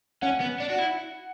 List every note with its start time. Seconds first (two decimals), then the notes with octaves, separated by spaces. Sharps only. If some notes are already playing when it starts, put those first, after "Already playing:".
0.22 C#4 F#5
0.40 B3
0.60 D4
0.70 F#4
0.78 E4